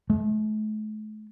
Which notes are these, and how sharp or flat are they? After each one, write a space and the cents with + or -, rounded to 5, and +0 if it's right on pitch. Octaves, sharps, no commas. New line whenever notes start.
A3 -40